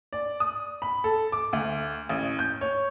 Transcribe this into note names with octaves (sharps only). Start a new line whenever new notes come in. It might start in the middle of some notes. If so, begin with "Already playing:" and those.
D5
D#6
B5
A4
D6
D2
A1
G6
C#5